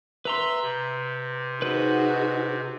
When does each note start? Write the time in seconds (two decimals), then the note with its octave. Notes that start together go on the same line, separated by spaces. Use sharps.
0.25 B4 E5 A#5 C6 E6
0.62 C3
1.62 D#4 F#4 G#4 B4 C5